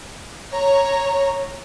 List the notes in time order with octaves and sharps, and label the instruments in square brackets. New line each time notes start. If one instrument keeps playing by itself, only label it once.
[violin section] C#5 A#5